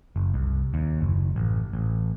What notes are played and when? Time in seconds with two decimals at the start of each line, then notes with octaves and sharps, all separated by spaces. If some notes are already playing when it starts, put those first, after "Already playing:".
0.16 F#1
0.34 C2
0.74 D#2
1.01 F#1
1.36 A1
1.73 A1